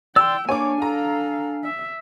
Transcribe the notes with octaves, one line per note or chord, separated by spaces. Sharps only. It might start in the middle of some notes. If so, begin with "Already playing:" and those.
D5 G5 C6 E6
A#3 D4 C#5 G#5 D6
A4 F5 A#5
E5